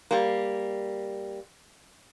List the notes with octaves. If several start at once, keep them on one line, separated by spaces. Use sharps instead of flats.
G3 A#3